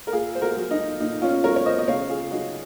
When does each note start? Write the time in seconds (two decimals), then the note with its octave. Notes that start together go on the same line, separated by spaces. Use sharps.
0.07 A#4
0.12 A#2 F4 G#4
0.35 C5
0.42 F#4 A#4
0.57 F#3
0.71 D#4
1.00 A#2 D#4
1.22 C#4 F4
1.44 F#3 A#4 C#5
1.56 C#5
1.66 C5 D#5
1.78 D#5
1.88 C#3 C#5 F5
2.09 F4 G#4
2.31 F#3 D#4 F#4